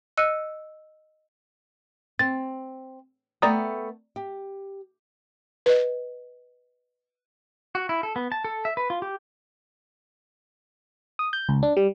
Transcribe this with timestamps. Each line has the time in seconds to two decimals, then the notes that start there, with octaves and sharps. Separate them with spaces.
0.17 D#5 E6 F#6 C#7 D#7
2.19 C4 A6
3.42 A3 B3 D5 G5 A#5 D#6
4.16 G4
5.66 B4 D#5
7.75 F#4
7.89 E4
8.03 A4
8.16 B3
8.32 A5
8.44 A4
8.65 E5
8.77 B4
8.90 F4
9.02 G4
11.19 D#6
11.33 G6
11.49 C#2
11.63 D4
11.77 G3